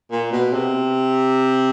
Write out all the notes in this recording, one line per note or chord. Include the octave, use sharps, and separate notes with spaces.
A#2
B2
C3